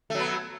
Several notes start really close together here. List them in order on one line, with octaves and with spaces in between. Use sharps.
A3 F#3 B3